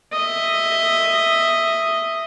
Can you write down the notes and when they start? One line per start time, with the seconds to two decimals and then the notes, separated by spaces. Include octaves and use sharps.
0.13 D#5 E5